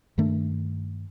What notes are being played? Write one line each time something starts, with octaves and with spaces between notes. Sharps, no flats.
G2 D#3 A3 D4